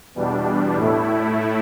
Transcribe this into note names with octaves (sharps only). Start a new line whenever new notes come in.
E2 B2 G3 D4
A2 A3 E4